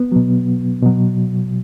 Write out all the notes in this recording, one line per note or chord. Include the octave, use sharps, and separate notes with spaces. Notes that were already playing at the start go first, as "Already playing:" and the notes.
Already playing: B3
B2 F#3
B2 F#3